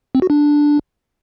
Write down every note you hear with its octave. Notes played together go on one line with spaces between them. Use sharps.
C4
F#4
D4